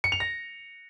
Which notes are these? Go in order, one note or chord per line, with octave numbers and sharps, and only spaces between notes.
C#7
F7
A#6